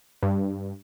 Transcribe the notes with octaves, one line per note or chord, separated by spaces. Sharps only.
G2